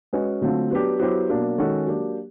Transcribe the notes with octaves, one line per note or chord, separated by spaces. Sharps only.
G#3 C#4 F#4 B4
D3 F#3 A3 C4 F4
F#3 B3 D4 G4
F#3 B3 E4 G4 C5
B2 F#3 A#3 D4
D#3 G#3 C#4 F#4 A4
F#3 A#3 D4 G4